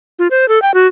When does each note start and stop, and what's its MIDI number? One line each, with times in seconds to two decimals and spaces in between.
0.19 0.28 65
0.31 0.48 72
0.48 0.61 69
0.62 0.74 79
0.74 0.87 66